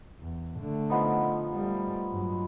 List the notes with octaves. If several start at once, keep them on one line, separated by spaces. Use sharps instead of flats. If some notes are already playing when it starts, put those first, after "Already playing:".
E2
D3 A3
F3 B3 D#4
G3 A3
G2 F#3